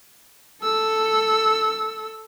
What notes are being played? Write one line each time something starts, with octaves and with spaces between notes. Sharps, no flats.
A4 E6